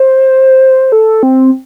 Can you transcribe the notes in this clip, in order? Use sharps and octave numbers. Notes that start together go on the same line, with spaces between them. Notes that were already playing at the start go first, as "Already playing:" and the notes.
Already playing: C5
A4
C4